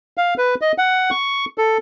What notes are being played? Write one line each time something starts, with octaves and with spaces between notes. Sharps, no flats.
F5
B4
D#5
F#5
C#6
A4